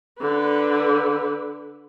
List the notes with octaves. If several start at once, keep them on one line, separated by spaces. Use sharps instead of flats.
D3 B4